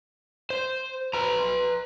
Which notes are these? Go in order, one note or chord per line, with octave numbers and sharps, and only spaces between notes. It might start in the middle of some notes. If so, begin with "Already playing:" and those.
C5
B4 A#5